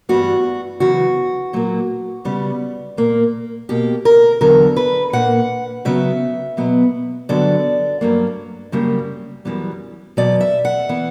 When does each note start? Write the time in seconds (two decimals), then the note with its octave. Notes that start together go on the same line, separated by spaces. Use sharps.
0.09 G2 E3 G3 B3 F#4
0.80 F#2 C#3 E3 B3 F#4
1.53 A#2 F#3 A#3
2.25 C#3 G3 B3
2.97 A#2 A#3
3.69 B2 A#3 G4
4.05 A#4
4.41 E2 D3 F#3 B3 A#4
4.76 B4
5.13 A#2 A#3 F#5
5.85 C#3 F#3 B3 E5
6.57 B2 F#3 B3
7.29 G2 D3 F#3 B3 D5
8.01 G2 F#3 A#3
8.72 F#2 C#3 G3 A#3
9.45 F#2 E3 G3 B3
10.17 E2 B2 F#3 D5
10.40 E5
10.65 F#5
10.89 E3 B3